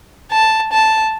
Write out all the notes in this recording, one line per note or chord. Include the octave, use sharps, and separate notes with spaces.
A5
A5